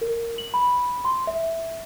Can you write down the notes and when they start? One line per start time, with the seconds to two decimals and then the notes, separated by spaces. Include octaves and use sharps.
0.01 A#4
0.38 F#7
0.54 B5
1.05 C6
1.27 E5